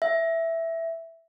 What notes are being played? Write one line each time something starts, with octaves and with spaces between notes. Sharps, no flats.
E5